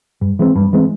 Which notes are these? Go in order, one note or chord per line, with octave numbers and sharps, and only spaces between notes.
G2
E3 G#3 C4
G2
E3 G#3 C4